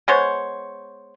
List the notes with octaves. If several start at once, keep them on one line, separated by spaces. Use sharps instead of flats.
G#3 B3 C5 C#5